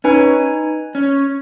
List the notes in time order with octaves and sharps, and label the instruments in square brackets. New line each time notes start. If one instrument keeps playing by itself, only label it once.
[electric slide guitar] C#4 [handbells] D#4 B4 G#5
[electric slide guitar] C#4